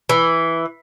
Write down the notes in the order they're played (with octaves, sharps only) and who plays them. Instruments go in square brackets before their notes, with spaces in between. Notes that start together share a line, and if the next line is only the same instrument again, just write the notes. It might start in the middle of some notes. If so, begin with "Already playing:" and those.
[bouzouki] E3